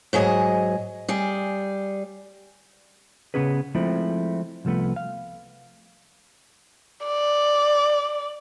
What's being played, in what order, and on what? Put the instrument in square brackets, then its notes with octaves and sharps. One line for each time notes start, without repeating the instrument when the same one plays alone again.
[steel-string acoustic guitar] G#2 F#3 G#4 D#5
G3 G#4
[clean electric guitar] C#3 A3 B3 C#4 G#4 B4
F3 G#3 A3 C4 E4
C2 F3 A3 B3
F5
[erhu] D5